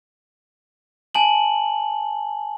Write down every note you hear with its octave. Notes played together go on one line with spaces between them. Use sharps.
G#5 A5 F#7